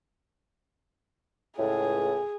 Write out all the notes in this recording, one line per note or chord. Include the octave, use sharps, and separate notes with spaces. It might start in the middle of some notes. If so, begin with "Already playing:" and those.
C#2 A2 G#4